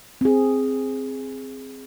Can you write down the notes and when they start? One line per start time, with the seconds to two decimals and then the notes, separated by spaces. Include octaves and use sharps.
0.21 C4 G#4